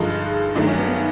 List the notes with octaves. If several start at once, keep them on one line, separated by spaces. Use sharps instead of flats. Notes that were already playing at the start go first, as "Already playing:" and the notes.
Already playing: G2 D3 F3 G#3 D#4
G2 D#3 F#3 A3 D4
C#4
B3
B3